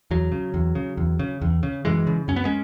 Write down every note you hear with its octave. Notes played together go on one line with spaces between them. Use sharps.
E2 F#3
C#3
E2
C#3
E2
C#3
E2
C#3
F#2 E3 G#3
C#3
F#2 C#4
B3
G#3 C#4